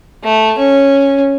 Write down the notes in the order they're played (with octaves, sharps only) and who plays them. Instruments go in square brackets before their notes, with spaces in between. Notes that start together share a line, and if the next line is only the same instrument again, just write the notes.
[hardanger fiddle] A3
C#4